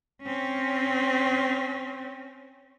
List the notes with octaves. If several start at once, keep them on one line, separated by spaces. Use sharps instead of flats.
C4 C#4